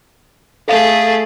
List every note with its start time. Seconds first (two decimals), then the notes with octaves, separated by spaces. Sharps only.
0.68 A3 G#4 A4 F5 D#6